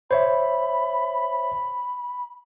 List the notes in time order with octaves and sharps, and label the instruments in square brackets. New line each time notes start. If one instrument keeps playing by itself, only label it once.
[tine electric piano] C5 C#5 E5 [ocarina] B5